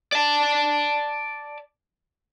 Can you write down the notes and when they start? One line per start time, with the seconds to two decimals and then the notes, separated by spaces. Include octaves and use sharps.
0.12 D5 A5